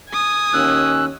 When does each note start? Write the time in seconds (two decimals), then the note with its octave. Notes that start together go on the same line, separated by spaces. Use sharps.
0.10 G#5 D#6
0.54 D#2 C#4 E6 F#6